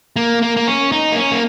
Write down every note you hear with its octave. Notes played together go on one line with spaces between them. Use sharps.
A#3
A#3
A#3
C#4
D#4
A#3
C#4
A#3